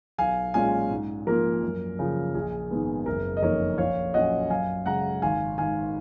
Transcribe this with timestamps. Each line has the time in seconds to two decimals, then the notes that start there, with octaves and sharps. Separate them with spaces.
0.18 B1 F5 G#5
0.54 A#2 G#3 C#4 F4 F5 G#5
0.91 G#2
1.26 F3 A#3 F4 A#4
1.63 F#2
1.99 C#3 F3
2.34 A#1 G#4
2.71 G#2 D#3 G#3 B3
3.06 F#1 A#4
3.37 D#5
3.42 F2 D#3 A#3 A#4 C#5
3.78 A#1 C#5 F5
4.14 A#2 F#3 C#4 D#5 F#5
4.50 F#2 F5 G#5
4.86 C#3 G#3 F#5 A#5
5.22 G#1 F5 G#5
5.58 G#2 D#3 F5 G#5